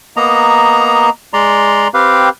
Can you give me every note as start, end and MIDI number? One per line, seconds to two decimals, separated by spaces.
0.17 1.10 58
0.17 1.10 59
0.17 1.10 75
0.17 1.10 82
1.33 1.88 56
1.33 1.88 74
1.33 1.88 82
1.33 1.88 84
1.94 2.29 60
1.94 2.29 67
1.94 2.29 71
1.94 2.29 77